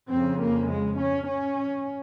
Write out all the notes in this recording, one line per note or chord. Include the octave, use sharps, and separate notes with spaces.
F2 C#3 C4
A#3
G#3
C#4
C#4